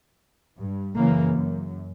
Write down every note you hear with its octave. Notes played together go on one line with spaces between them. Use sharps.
G2
F#2 C#3 E3 A#3
F#2